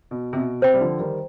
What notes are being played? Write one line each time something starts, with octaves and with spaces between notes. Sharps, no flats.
B2
C3
B2
C3 C5 G5 B5
G3
D3 F3
D#3 G3